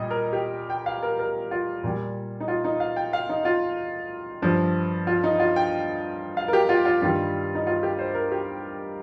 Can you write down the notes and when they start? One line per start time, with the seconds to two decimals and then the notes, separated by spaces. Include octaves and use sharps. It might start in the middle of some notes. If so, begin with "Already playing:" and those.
Already playing: A#2 G3 D#5
0.11 A#4
0.33 G4
0.70 G5
0.86 F5
1.03 A#4
1.19 A#4
1.51 F4
1.83 A#2 G3
2.40 D#4
2.48 F4
2.64 D#4
2.80 F5
2.96 G5
3.13 F5
3.29 D#4
3.45 F4
4.42 G2 F3
5.07 F4
5.23 D#4
5.40 F4
5.56 G5
6.37 F5
6.48 A#4
6.53 G4
6.69 F4
6.85 F4
7.02 G2 D#3 G3 F4
7.55 D#4
7.67 F4
7.83 G4
7.99 C5
8.14 A#4
8.32 G4